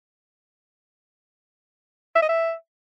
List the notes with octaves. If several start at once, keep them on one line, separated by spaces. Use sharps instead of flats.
E5
D#5
E5